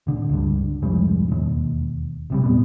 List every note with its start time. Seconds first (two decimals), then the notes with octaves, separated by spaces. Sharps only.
0.07 D1 D3
0.29 C#2 G2
0.82 C2 F2 G#2 G3
1.28 E1 D#2
2.30 B1 C3 G3
2.44 E2 A#2 B3